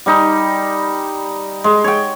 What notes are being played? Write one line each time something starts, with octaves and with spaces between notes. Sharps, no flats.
G3 D#4
G#3
C#5 G5